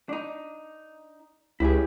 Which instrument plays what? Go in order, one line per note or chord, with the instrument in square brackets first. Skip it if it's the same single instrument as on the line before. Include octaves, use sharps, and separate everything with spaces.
[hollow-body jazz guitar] D4 D#4
[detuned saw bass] C#2 [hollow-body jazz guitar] E4 G4 G#4